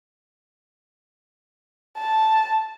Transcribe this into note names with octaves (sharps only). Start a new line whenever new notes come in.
A5